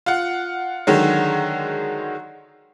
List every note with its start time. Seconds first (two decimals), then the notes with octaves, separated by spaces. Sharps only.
0.06 F4 F#5
0.87 D3 D#3 F#3 G#3